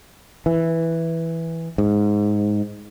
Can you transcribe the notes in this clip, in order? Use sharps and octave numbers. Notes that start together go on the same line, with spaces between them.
E3
G#2